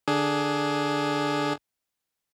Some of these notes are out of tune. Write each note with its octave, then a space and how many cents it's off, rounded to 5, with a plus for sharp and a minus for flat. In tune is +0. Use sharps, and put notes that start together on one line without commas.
D3 +0 D4 +0 G#4 +10